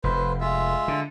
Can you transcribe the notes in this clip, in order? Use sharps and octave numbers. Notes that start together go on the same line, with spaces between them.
F1 B4 C5
G#3 F4 E5
D3